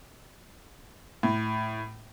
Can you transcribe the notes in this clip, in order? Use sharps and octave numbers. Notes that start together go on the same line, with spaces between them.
A2